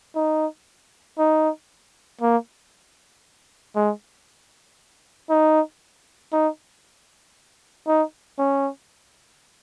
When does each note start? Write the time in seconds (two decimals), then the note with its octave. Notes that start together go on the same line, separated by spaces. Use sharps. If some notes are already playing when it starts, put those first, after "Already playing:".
0.15 D#4
1.19 D#4
2.21 A#3
3.76 G#3
5.30 D#4
6.33 D#4
7.87 D#4
8.39 C#4